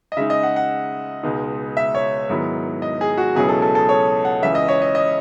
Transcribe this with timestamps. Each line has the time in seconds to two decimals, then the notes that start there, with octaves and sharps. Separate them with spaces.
0.12 D#5
0.17 C#3 G#3 D#4 E5
0.30 D#5
0.43 F#5
0.56 F#5
1.23 C#2 B2 G#3 D#4
1.77 E5
1.95 C#5
2.29 G#2 D#3 F#3 B3 E4
2.82 D#5
3.01 G#4
3.18 F#4
3.35 C#2 B2 F#3 C#4 E4 G#4
3.49 A4
3.62 A4
3.75 A4
3.89 C#5
4.25 F#5
4.42 C#2 C#3 E3 E5
4.55 D#5
4.68 C#5
4.82 D#5
4.95 D#5